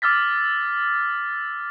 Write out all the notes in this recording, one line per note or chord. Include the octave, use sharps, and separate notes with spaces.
D6 E6 F6 A6 B6